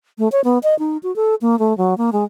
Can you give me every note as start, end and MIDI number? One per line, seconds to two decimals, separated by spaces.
0.18 0.28 57
0.32 0.41 73
0.44 0.58 59
0.63 0.77 75
0.79 0.97 63
1.03 1.14 66
1.16 1.35 69
1.41 1.59 58
1.59 1.76 57
1.78 1.97 54
1.98 2.10 58
2.13 2.24 56